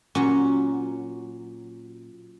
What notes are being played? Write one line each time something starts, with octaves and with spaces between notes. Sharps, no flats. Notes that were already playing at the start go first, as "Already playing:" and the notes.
A#2 F#3 C#4